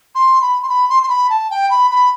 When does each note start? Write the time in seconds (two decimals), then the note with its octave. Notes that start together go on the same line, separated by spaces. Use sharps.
0.15 C6
0.41 B5
0.62 C6
0.69 B5
0.89 C6
1.02 C6
1.09 B5
1.29 A5
1.50 G5
1.70 B5
1.90 B5